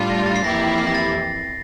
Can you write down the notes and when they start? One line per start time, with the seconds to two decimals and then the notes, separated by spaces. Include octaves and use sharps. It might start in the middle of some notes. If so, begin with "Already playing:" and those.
Already playing: A2 G3 D4 F4
0.10 A#6
0.26 A6
0.36 C7
0.43 F2 E3 A#3 E4 G4 A#6
0.61 C7
0.78 C7
0.87 A#6
0.94 A6